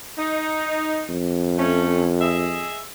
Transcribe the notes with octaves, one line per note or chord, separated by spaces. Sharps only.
D#4
F2
A3 C#4
G#4 D#5 E5